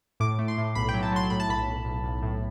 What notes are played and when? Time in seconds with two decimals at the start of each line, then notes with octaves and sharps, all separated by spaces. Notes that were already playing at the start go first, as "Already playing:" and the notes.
0.20 A2 D6
0.39 A3
0.48 C6
0.58 A2
0.75 B1 B5
0.89 G5
0.94 F#3
1.03 A5
1.12 F#3 C6
1.30 A2 B5
1.40 A5
1.49 B1 B5
1.67 B1
1.85 B1
2.03 B1
2.23 A2